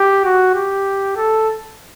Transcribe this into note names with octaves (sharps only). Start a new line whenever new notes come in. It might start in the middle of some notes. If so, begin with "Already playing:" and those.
Already playing: G4
F#4
G4
A4